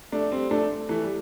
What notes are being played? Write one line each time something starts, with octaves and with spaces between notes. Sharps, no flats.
A3 D4
G3 C4
A3 D4
E3 A3
G3